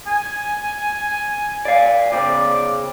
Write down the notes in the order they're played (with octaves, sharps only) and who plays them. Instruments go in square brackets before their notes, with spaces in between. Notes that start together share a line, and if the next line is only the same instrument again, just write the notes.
[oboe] G#5
[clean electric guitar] D5 F5
[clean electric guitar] C#3 C5 [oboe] D5